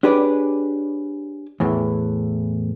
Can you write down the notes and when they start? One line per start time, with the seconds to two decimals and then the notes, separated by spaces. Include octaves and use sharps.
0.03 D4 G4 G#4 B4 C#5 D5
1.60 E2 A2 E3